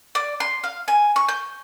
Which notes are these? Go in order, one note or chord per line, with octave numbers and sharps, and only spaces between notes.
D5
C6
F5
G#5
C#6
G6